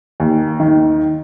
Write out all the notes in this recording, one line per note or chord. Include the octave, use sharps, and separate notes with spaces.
D#2
D#3